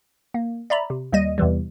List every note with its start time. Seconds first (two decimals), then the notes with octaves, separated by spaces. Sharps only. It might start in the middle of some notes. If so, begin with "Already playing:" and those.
0.34 A#3
0.70 D5 E5 A#5 B5
0.90 C3
1.12 D#2 G3 D#5 D#7
1.38 E2 C3 E3 G3